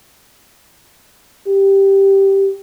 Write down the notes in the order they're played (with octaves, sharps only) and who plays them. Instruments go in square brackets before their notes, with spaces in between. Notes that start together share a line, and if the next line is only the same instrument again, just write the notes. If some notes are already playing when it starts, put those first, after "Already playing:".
[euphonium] G4